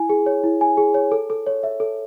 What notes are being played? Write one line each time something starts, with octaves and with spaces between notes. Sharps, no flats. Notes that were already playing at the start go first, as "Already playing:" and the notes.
Already playing: E4 G#5
G#4
C#5
E4
G#5
G#4
C#5
A4
A4
C#5
E5
A4